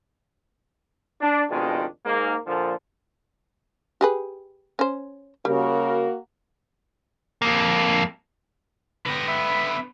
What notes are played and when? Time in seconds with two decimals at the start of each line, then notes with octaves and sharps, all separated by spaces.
1.20 D4
1.50 F2 B2 D#3 G#3 D4 F4
2.06 G#2 A#3
2.47 A#2 D3 F3
4.01 G4 G#4 B4
4.79 C#4 C5
5.45 C#3 G3 A#3 F#4 A#4
7.42 F2 A#3
9.06 D3 B3 B4 G5 A#6
9.28 E5 B5